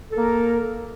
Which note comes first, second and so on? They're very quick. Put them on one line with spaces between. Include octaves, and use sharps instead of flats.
A4 A#4 A#3